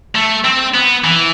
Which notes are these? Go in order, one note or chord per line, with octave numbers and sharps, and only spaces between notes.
A3
C4
B3
E3